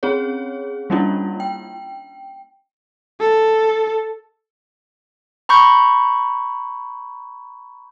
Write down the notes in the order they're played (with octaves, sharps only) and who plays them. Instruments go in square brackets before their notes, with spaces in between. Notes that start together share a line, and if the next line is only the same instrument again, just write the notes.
[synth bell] C4 C#4 G#4 C#5
G3 A#3 C#4 D4 E4 F4
G5
[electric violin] A4
[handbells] A#5 B5 C#6 G6